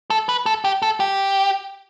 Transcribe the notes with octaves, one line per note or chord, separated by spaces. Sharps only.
A4
B4
A4
G4
A4
G4